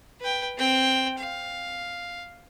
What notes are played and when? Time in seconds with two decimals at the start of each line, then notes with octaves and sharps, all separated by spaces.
0.20 B4 G5
0.57 C4 G5
1.18 F5